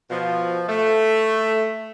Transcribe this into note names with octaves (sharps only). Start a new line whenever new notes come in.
B2 F3
A3